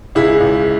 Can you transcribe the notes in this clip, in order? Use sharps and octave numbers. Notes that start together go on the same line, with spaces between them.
C#2 E4 G#4
C#2